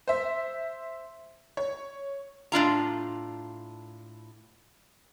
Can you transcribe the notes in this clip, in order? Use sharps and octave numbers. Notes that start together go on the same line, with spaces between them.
C5 E5
C#5
A2 D4 F4 A#5